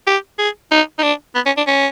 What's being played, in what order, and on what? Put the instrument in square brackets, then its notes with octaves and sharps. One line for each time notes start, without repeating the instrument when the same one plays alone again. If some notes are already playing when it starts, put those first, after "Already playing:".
[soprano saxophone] G4
G#4
D#4
D#4
D4
B3
C#4
D4
C#4